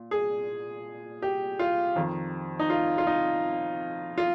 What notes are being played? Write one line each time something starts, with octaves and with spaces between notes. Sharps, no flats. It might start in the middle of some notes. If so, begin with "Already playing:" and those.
Already playing: A#2
G#4
G4
F4
F2 D#3
D#4
F4
F4
D#4
F4